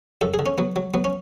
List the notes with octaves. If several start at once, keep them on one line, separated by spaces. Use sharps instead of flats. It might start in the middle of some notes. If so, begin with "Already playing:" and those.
F#2 A4
G#4
D3
C#4
F#3 B3
F#3
F#3 B3
C#4